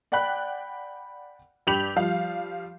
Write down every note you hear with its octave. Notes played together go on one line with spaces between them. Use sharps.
D5 F#5 G5 B5 F#6
G2 G4 B5 G6 F7 F#7
F3 G3 F5